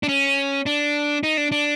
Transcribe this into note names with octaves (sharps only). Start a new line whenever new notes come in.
D4
C#4
D4
D#4
D4
D4